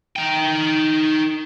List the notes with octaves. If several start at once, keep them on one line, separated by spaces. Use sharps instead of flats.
D#4 G5